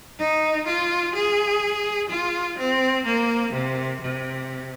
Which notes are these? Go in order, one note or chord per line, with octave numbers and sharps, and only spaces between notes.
D#4
F4
G#4
F4
C4
A#3
C3
C3